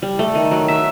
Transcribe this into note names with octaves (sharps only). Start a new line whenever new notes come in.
G3
A3
D#3
F#3
E5